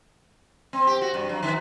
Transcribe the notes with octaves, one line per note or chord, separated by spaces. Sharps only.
C4
G4
F#4
G2
F#3
D#3